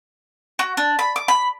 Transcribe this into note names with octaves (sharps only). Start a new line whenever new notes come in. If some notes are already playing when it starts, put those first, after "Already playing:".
F#4
D4
B5
D6
B5